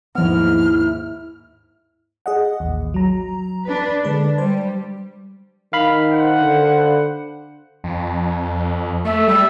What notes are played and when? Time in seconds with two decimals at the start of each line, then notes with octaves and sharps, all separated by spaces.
0.15 D#2 G#2 F3 B3 E4 F6
2.26 G#4 D#5 F#5
2.60 A1 D#2
2.94 F#3 A#5
3.65 D4 B4
4.05 D3 G#3 D4 B4
4.38 G3 C5
5.73 D#3 F5 B5
6.11 C5 F#5
6.41 D3
7.84 F2
9.05 A3 E5
9.28 G3 E6